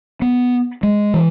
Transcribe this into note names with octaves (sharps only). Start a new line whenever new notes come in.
B3
G#3
E3